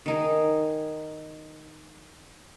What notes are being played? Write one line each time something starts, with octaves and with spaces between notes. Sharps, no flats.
D#3 D#4 G#4